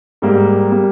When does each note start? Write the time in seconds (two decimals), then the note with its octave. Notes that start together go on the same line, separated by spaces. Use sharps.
0.22 G#2 G3 A#3
0.71 G3 A#3